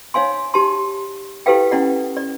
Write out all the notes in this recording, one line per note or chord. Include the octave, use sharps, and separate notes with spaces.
D#4 C#5 F5 G#5 C6
D#4 G4 A5 C6
E4 G4 A4 B4 F5 G5
C#4 E4 D5 F#5
D5